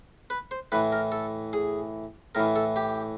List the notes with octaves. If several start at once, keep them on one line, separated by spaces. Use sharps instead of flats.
B4
C5
A2 E3 B4
A#4
A4
G#4
A2 E3 A#4
A4
G4